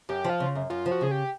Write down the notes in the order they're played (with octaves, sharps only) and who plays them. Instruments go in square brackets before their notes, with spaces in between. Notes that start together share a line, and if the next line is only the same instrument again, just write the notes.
[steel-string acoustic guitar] F#2 [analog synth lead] G4
[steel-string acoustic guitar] F3
[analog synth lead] F4
[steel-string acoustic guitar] C#3
F#2
[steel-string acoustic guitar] F#2 [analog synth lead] F4
[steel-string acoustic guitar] F3
[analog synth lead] F#4
[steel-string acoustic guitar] C#3 [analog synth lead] G#4
[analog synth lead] G4